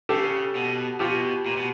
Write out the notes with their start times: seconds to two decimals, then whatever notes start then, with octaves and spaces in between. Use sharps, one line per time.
0.09 C#3 G4 A4
0.55 B2
1.00 B2 F4 G4
1.46 A#2
1.57 B2